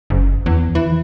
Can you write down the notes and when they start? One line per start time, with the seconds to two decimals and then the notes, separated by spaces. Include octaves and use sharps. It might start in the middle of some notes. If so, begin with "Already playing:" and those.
0.10 F#1
0.46 E2
0.75 E3